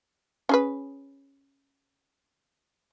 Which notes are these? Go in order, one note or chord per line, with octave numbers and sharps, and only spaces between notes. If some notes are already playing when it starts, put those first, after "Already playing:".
C#4 G#4 B4